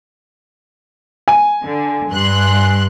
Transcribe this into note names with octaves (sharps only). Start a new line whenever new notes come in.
G#5
D3
G2 C6 F#6